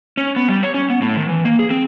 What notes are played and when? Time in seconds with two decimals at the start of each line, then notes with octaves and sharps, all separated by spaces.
0.17 C#4
0.36 B3
0.49 G3
0.63 C#5
0.74 C#4
0.90 B3
1.02 A2
1.16 D#3
1.29 E3
1.45 A#3
1.59 G#4
1.71 C4